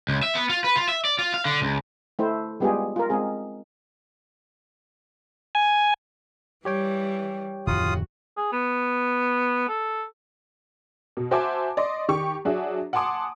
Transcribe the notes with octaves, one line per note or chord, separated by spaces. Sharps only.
C#2
E5
B3
F4
B4
F4
E5
D5
F4
F5
D3
C#2
A3 E4 C5
G3 G#3 B3 F4 G4 G#4
F4 A#4
G#3 C4 G#4
G#5
E3 G3 G4 C#5 G5
D1 F2 D#3 F4 F#4 D#6
G#4
B3
A4
B2
F#4 C5 E5 G#5 A5 D6
D5 D#5 C6
D#3 G4 C#6
F#3 D4 F#4 G#4 E5
F#5 G#5 A5 C6 D6 D#6